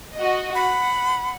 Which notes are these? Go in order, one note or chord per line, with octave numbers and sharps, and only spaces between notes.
F#4 D#5
F#5 B5